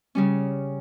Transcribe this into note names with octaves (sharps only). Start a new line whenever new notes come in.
C#3 G3 C#4